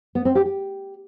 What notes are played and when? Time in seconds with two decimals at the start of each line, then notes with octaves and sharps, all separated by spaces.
0.15 B3
0.25 C4
0.35 G4
0.45 G4